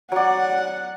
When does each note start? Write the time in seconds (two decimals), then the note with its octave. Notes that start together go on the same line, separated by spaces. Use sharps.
0.12 F#3 D5 F#5